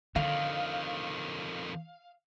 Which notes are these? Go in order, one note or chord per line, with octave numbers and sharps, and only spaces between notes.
F2 D3 D#3 F5